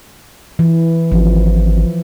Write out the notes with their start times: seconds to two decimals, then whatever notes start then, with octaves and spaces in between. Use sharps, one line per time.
0.59 E3
1.12 G#1 F3